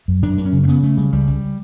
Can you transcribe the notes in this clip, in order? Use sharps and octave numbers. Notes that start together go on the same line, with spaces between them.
F#2
F#2 D4
F#2
C#4
C#3
A3
C#3 B3
C#3 A3
C#3 G3
C#2 G3
C#2